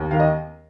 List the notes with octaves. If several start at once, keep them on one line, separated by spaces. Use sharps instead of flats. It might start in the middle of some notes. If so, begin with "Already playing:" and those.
Already playing: D#2
D#3 F5
D#5